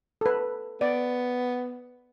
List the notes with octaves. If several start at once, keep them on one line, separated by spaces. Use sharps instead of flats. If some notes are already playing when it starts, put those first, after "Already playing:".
A4 B4
B3 D5